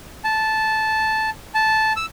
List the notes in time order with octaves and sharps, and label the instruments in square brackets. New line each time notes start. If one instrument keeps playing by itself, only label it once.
[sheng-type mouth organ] A5
A5
E6